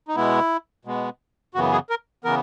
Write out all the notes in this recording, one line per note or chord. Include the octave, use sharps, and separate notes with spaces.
D#4
B2 G#3 B3 E4
B2 G#3 B3
F#2 C#3 E3 B3 F#4
G#4
A#4
C#3 E3 B3 A#4